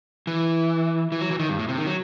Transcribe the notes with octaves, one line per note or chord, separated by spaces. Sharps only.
E3
E3
F#3
E3
D#3
G2
A2
C3
D#3
F#3